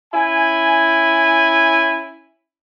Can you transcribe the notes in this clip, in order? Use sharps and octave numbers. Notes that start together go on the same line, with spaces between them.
C#4 E4 G#5